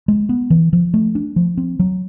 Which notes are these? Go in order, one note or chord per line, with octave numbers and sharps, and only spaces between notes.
G#3
B3
E3
F3
A3
D4
F3
C4
F#3